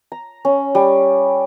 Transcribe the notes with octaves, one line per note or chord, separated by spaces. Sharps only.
A#5
C#4
G3